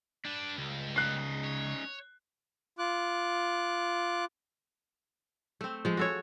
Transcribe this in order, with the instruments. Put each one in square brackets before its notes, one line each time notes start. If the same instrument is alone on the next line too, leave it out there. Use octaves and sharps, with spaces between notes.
[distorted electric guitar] G3 B4 [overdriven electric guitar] D4
[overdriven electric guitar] C#2
[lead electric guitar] C#4 D#4 [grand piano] F#6 C7
[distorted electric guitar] C#5
[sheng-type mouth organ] F4 D6 F#6
[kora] A3 C4
F3 G#3
F#4 A4 C#5